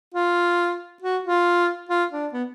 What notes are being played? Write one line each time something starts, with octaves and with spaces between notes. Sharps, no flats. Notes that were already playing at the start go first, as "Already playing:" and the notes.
F4
F#4
F4
F4
D4
B3